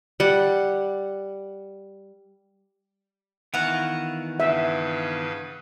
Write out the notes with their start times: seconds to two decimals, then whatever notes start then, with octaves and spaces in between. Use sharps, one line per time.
0.20 G3 F#5
3.54 D#3 E3 B3 F#4 F5 F#5
4.40 G2 C#3 B4 E5